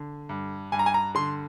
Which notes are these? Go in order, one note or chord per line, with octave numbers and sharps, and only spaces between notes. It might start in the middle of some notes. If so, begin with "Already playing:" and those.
Already playing: D3
G2
G2 G#5
A#5
G#5
A#5
D3 C6